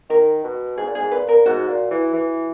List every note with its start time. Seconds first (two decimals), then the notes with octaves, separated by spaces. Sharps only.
0.10 D#3 A#4
0.44 B2
0.77 G#2 G#4
0.87 A#2
0.95 G#2 G#4
1.11 A#2 B4
1.29 A#4
1.46 G#2 F#4
1.68 A#2
1.91 E3
2.13 E3